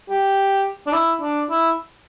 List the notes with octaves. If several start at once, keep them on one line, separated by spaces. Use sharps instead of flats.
G4
D4
E4
D4
E4